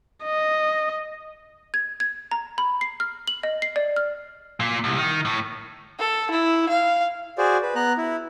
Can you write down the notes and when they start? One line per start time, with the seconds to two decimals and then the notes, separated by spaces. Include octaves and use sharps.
0.25 D#5
1.74 G#6
2.00 G#6
2.31 A#5
2.58 B5
2.81 C7
3.00 F6
3.28 F#7
3.43 D#5
3.62 C7
3.76 D5
3.96 F6
4.60 A#2
4.84 C2
4.98 D#3
5.25 A2
5.99 A4
6.31 E4
6.69 F5
7.38 F#4 G#4 C5 D5
7.63 B4
7.75 B3 A#5 F#6
7.98 E4